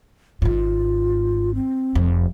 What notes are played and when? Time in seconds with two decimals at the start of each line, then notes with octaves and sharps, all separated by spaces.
0.42 G#1 G#2 F4
1.55 C4
1.95 F1 F2